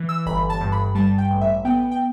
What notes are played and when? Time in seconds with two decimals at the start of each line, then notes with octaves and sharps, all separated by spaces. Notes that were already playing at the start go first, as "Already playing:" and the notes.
Already playing: E3
0.09 E6
0.26 G1 B5
0.50 A5
0.61 G2
0.72 B5
0.95 G3 A5
1.18 G5
1.30 A1
1.41 E5
1.65 B3 G5
1.91 G5